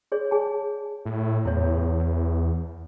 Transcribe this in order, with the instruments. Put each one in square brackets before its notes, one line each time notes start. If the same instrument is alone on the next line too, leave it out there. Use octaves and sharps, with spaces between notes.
[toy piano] G#4 C#5 D5
G#4 G#5 A5
[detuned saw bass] A2
[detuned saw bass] E2 [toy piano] E4 C#5